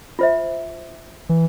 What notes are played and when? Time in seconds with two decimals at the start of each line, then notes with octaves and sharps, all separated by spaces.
0.19 F4 C5 E5
1.29 E3